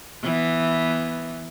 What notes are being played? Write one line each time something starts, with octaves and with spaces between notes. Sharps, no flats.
E3 B3